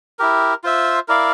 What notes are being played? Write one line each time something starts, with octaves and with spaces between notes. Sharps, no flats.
E4 G4 A#4
F4 C5 E5
E4 A#4 D5 F5